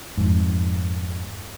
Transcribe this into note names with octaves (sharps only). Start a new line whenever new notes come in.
F2 G#2